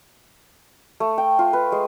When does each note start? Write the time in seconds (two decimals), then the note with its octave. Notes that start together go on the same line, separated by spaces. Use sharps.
1.00 A3
1.18 G5
1.39 F4
1.53 B4
1.72 G#3